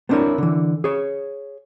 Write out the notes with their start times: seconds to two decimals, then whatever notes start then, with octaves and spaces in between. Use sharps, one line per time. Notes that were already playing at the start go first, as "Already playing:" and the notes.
0.09 B3 C4 D4 E4 A#4 C#5
0.38 D3 E3
0.84 G#4 C#5